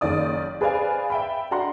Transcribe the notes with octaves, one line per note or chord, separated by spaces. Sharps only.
F#1 D#3 A#3 D5 D#6
G#4 B4 C5 D5 F5 G#5
E5 G5 B5
D4 F#4 F#5 A#5 C6